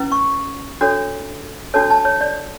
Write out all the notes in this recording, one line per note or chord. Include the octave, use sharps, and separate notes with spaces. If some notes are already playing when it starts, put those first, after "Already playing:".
Already playing: C#4 E4 B4
C#6
D4 F#4 A4 C#5
D4 F#4 A4 C#5 A5
A5
C#5
D5